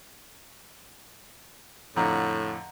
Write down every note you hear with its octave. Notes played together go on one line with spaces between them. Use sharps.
F2 A2 D3 F#5 A#5